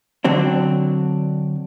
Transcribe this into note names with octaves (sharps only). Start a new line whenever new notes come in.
D3 F#3 C4 D4